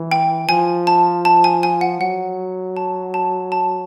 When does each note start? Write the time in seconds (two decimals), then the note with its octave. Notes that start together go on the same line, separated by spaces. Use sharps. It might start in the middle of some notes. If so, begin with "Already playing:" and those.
Already playing: E3
0.11 G5
0.49 F3 G#5
0.87 A5
1.25 A5
1.44 G#5
1.63 G#5
1.81 F#5
2.00 F#3 F#5
2.77 A5
3.14 A5
3.52 A5